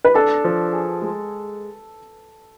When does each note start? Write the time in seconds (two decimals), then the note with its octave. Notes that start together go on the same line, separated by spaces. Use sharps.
0.05 B4
0.14 D4 A4
0.44 F3
0.73 G#4
1.02 G#3